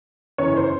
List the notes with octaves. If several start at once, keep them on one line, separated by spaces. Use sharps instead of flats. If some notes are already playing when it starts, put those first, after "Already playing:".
G1 F#2 C#3 E3 C#5
C5